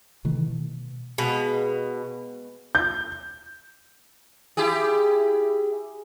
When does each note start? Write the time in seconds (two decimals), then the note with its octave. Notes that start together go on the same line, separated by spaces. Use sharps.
0.25 C3 D#3 E3 A3
0.47 B2
1.18 B2 G#3 B3 F5
2.75 G6
4.57 E4 G4 G#4